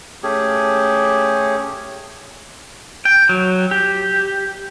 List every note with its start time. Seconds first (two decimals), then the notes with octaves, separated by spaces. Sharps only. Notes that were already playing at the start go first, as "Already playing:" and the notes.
0.23 A3 C#4 G4 G#4
3.05 G5
3.29 F#3
3.71 G4